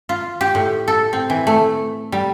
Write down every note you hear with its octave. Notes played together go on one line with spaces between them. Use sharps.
F4
G4
A2
A4
C4
E3
A3
G3